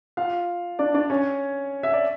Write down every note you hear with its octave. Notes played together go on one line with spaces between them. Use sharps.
F4 F5
D4 D5
D4 D5
C#4 C#5
E5
D5